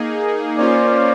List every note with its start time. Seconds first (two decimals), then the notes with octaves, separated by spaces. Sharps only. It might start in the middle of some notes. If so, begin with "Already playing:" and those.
Already playing: A#3 D#4 G#4
0.58 A#3 C#4 F4 C5 D5